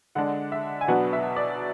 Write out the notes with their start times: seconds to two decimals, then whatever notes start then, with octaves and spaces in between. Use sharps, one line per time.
0.15 D3 G#3 D4 F#5
0.52 E5
0.81 G#5
0.88 B2 F#3 B3 D4 F#5
1.13 E5
1.37 D5